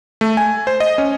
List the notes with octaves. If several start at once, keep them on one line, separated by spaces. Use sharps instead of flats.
A3
G#5
C5
D#5
C#4